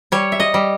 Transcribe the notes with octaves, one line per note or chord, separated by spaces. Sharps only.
G3 C#5
E5
D#5
G3